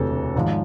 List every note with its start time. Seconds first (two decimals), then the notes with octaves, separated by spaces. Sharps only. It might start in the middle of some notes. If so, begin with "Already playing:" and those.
Already playing: E1 D2 C3 E3 A4
0.35 G#1 G#2 F3